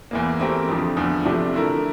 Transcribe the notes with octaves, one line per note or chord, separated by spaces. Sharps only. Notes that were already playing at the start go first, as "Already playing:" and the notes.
E2 E3 A#3
E3 A3 C4 G4 A#4
F2 D3 F3
E2 D3 F3 A3
C3 F3 A3 D4 G4
D3 A3 E4 A#4